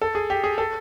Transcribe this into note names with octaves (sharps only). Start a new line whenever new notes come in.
A4
G#4
G4
G#4
A4